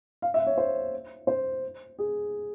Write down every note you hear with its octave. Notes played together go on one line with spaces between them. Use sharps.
F5
E5
C#5
C5
C5
G#4